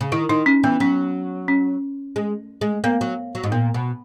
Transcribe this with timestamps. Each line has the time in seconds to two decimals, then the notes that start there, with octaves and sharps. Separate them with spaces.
0.01 C#3
0.12 D#3 E4
0.29 D#3 D#4
0.46 C#4
0.64 E3 B3
0.80 F#3 C#4
1.48 C#4
2.16 G#3
2.61 G#3
2.84 A#3 B3
3.01 F#3
3.35 F#3
3.44 G#2
3.52 A#2 B3
3.74 B2